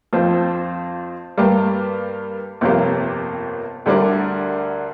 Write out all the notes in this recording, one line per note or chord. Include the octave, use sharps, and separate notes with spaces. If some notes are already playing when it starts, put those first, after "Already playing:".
F2 F3 C4 F4 C5
G2 G3 A#3 G4
G1 F2 C3 A#3 G4
D2 D3 G3 D4 A#4